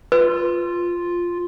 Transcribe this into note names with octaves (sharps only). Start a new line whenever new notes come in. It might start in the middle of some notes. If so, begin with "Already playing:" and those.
F4 B4